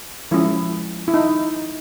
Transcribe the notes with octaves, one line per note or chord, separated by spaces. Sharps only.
F3 G#3 C#4 E4
E4
D#4